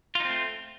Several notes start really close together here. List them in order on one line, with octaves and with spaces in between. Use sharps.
F4 D#4 C4 A3